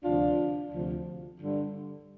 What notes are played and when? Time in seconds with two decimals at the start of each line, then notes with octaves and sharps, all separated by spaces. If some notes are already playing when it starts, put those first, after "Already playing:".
0.04 D2 C3 F3 D4 F4
0.72 D2 C3 F3
1.39 G2 D3 G3